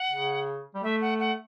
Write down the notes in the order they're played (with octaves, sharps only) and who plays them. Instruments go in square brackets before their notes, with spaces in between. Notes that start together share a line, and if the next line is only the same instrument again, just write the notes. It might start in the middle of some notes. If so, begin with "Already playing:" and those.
Already playing: [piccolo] F#5
[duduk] C#3
G3
[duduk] A3 [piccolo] E5
[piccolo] F#5
F#5